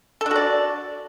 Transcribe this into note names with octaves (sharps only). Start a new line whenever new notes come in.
D4 F#4 A4 D5